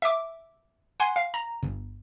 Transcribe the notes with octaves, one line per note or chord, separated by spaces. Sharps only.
E5 D6
F#5 G#5 C6
F5
A#5
G1